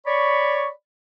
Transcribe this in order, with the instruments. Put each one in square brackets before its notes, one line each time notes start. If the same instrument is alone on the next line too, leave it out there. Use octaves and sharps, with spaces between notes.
[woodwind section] C#5 D5 B5 C#6